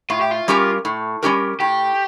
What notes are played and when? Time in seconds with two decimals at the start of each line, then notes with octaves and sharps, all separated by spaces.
0.10 A2 F4
0.21 G4
0.31 F4
0.48 G3 C#4 G4 A#4
0.85 A2
1.23 G3 C#4 G4 A#4
1.60 A2 G4